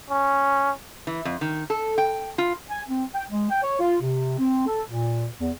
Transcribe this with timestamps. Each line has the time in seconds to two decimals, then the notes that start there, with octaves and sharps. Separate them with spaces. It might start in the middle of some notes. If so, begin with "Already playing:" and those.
0.10 C#4
1.07 E3
1.25 F2
1.41 D#3
1.70 A4
1.98 G5
2.38 F4
2.70 G#5
2.89 C4
3.15 G5
3.30 G#3
3.50 G5
3.63 C#5
3.80 F4
4.01 C3
4.39 C4
4.67 A4
4.89 A#2
5.40 E2